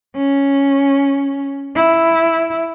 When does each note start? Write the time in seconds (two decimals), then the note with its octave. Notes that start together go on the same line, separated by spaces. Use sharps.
0.16 C#4
1.76 E4